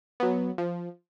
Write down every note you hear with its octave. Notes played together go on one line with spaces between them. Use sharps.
F#3 B3
F3